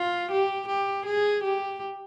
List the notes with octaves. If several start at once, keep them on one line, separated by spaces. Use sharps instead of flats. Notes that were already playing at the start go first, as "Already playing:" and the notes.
Already playing: F4
G4
G4
G#4
G4